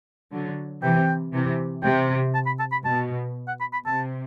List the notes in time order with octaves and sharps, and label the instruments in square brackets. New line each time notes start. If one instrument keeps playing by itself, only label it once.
[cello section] D3 F#3
[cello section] C3 E3 [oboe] G5
[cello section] C3 E3
[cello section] C3 [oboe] G5
[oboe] A5
B5
A5
B5
[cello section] B2 [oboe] A5
[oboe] F#5
B5
B5
[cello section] C3 [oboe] A5